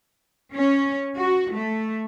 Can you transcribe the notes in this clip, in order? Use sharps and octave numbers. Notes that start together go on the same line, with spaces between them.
C#4
F#4
A3